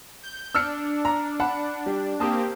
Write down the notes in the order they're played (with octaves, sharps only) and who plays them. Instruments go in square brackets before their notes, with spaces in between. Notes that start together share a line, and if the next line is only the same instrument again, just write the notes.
[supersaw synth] G6
[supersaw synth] D4 [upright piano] E6 F6 C#7
[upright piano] A#5
F#5 A5 B5
G3
[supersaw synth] A#3 C4 G4 [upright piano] A5 D#6